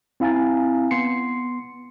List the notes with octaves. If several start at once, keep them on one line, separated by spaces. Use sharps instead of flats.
C4 E4 F5 G#5 A#5 A6
B3 C6 C7 C#7